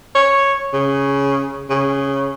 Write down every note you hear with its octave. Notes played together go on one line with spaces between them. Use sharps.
C#5
C#3
C#3